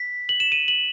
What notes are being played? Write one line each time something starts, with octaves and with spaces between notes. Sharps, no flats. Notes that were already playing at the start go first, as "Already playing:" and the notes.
Already playing: B6
F#7
E7
D#7
F#7